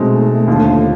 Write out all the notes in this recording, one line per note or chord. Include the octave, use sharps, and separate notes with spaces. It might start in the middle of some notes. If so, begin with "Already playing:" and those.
Already playing: B2 G#3 A3 C4 D#4
D#2 D3 F3